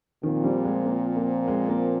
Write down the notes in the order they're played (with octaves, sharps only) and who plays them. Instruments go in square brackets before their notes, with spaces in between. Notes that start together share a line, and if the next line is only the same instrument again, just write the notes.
[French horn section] A#2 F3 C4 [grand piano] D#3
[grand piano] G3
G#3
A#3
A#3
G#3
A#3